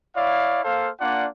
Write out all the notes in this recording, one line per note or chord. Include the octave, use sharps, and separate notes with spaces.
E4 C#5 D5 F5
A#3 A4 C5 F5
A#3 D4 F4 D5 F#5